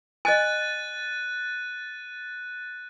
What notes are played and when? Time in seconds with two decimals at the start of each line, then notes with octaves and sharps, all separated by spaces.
0.25 D#5 G#5 F#6 A6 D#7